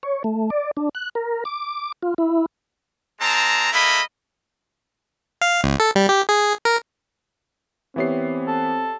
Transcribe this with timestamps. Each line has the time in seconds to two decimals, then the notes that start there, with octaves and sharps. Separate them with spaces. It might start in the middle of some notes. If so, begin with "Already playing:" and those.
0.03 C#5
0.24 A3
0.50 D5
0.77 D4
0.95 F#6
1.15 A#4
1.45 D6
2.03 F4
2.18 E4
3.21 G#3 C4 A5 A#5
3.72 A3 A#3 E4 D#5 B5
5.42 F5
5.64 C#2
5.80 A4
5.96 G3
6.09 G4
6.29 G#4
6.65 A#4
7.96 E3 B3 C4 G4 C#5 E5 C7
8.48 A4